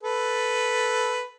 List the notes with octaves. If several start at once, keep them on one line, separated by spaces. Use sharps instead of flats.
A4 B4